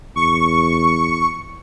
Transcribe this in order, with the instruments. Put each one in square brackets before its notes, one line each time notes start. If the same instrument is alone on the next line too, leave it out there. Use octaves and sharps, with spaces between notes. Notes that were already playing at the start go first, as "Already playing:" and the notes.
[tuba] E2 [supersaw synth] C#6